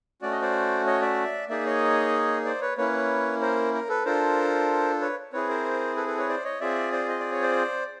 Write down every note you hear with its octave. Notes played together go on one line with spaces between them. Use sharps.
A3 C#4 F#4 D5
D#5
C5 D5
C#5 D#5
D5 E5
A#3 D#4 G#4 D5 E5
C#5 D#5
C5 D5
B4 C#5
A#3 C#4 E4 B4 C#5
A#4 C5
A#4
A4 B4
D4 F4 A4 A#4 C5
B4 C#5
C4 E4 G#4 B4 C#5
A#4 C5
A4 B4
A4 B4
B4 C#5
C5 D5
C#5 D#5
C4 F4 G#4 D5 E5
C5 D5
D#5
D5
C#5
C5 D5